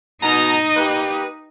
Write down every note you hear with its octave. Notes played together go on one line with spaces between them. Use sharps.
B2 D#4 D#5 A#5
A#3 G4 B4